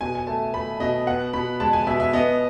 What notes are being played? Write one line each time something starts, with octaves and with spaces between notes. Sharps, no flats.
B2 G#5
G#5
A3 A5
A3 B5
B2 D#5
B3 F#5
B2 B5
G#3 A5
G#5
B2 E5
E5
B3 D#5